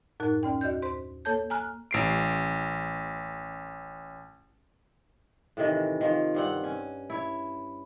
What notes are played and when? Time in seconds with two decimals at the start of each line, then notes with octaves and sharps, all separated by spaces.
0.20 F#2 A2 D#4 A#4 F#6
0.43 D2 C#4 G5
0.61 D#2 F#4 D5 G6
0.82 C5 C6
1.25 A#3 A4 C#5 A5 G6
1.50 G#5 A#5 F6 F#6
1.91 A1 C7 D7
5.57 A2 C3 D#3 E3
6.01 D#3 F3
6.34 G2 C4 F#5
6.64 C#4
7.10 E4 C#5